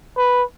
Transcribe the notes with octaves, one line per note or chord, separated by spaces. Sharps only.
B4